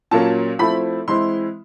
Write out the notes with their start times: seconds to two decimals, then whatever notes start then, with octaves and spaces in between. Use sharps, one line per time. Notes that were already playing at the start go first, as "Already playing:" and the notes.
0.11 A#2 F#3 A#3 C#4 A5
0.59 F3 A3 C4 E4 B5
1.08 E3 G#3 C4 E4 C6